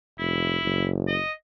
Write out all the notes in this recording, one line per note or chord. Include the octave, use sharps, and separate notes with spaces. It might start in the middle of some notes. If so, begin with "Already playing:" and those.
F1 E4
F#1
D#5